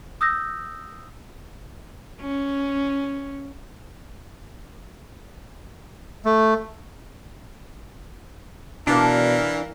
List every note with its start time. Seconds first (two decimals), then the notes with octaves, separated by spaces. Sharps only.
0.21 D#6 E6 G6 A#6
2.21 C#4
6.25 A3
8.87 B2 E3 D4 A#4 F5